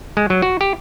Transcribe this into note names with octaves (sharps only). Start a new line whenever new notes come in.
G#3
F#3
F#4
G4